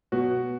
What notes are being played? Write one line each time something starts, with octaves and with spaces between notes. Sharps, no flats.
B2 F#3 B3 F#4